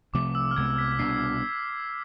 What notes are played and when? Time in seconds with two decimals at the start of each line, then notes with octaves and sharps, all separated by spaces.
0.13 C2 C3 F3 A3 D6
0.35 E6
0.51 F6
0.56 C2 C3 G#3 B3 G#6
0.78 B6
0.92 B6
0.99 C2 B2 B3 D4 C7